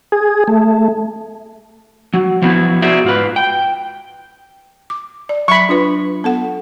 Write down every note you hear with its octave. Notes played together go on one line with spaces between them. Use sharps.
G#4
A3
F#3
F3 F#3 B3 C4 E4
F#4 G#4 A#4 C5 D5 E5
G#2 F4 B4
G5
D6
D5
F#3 E5 B5 C#6
D4 F4 B4
B3 A4 F#5